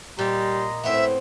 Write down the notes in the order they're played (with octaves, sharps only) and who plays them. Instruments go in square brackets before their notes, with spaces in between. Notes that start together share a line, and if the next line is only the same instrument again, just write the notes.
[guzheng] A#2 [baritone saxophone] G3 [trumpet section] D#5 A#5 C6
[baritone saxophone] A2 [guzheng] B3 C4 [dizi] E5